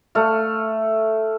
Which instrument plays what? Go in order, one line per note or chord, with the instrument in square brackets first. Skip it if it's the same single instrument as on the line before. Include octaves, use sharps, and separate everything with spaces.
[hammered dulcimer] A3 F5